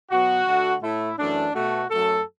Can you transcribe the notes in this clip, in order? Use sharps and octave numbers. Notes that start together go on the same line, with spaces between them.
B2 F#3 B3 F#4
D3 A3
A2 A3 E4
F#2 E3 A3 D4
B2 A3 F#4
F#2 F#3 A3 A4